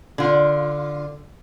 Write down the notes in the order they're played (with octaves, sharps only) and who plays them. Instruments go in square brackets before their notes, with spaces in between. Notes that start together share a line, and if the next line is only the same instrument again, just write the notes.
[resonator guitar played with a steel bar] D3 F4